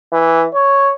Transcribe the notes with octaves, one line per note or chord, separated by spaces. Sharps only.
E3
C#5